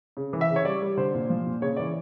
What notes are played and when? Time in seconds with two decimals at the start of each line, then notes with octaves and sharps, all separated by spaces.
0.17 C#3
0.33 E3
0.41 E5
0.50 C#3
0.56 C#5
0.65 G3 D5
0.82 G3
0.97 D3 C5
1.14 A#2
1.30 F3
1.47 A#2
1.62 C#3 C#5
1.77 E3 D5